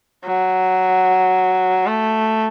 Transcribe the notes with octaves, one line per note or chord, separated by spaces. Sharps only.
F#3
A3